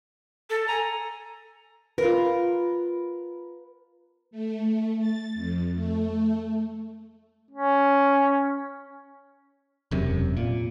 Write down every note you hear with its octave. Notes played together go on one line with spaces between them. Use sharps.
A4
G#5 A#5
F4 A#4 B4
A3
A6
F2
A3
C#4
E1 F#2 C3
A#2